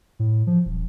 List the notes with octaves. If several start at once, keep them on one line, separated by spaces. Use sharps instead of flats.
A2
F3
D#1